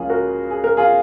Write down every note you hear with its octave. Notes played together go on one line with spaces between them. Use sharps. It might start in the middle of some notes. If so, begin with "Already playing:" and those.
Already playing: C#2 C#3 F3 A#3 C#4 F4 G#4
F#4 A#4
G#4
A#4
F4 G#4